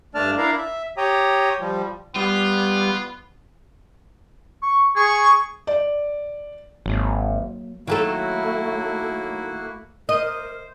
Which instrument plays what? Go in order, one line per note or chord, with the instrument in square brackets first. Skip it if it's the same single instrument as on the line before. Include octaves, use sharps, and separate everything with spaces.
[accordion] G2 A3 D4 D5 A5 F6
D4 E4 A#4 D5 F5 A#5
E5
G4 C#5 G5 A#5 D#6
F3 G3
[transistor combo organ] G3 [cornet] B3 [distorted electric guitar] F4
[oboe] C#6
[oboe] G#4 [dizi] C#6
[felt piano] D5
[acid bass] G#1 [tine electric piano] F#3 A#3
[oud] D#3 F#3 A4 [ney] A3 [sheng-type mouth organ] A#3 E4 F#4
[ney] A#4 [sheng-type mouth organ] C5 [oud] D#5